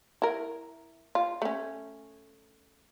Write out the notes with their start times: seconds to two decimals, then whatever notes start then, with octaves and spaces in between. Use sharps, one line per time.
0.22 E4 A#4
1.15 F4
1.42 A3 C#4